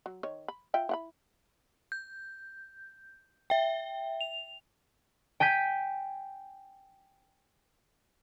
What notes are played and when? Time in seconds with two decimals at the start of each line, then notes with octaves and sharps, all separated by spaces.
0.06 F#3
0.23 D#3 C#5
0.48 B5
0.74 F4 E5 G5
0.89 E4 F#5 B5
1.92 G6
3.50 E5 G5
4.21 F7
5.40 G5 G#5 G6 B6